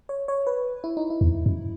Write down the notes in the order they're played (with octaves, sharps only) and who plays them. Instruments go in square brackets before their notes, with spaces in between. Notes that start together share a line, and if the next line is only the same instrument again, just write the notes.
[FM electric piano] C#5
C#5
B4
E4
D#4
E4
[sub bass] E2
F#2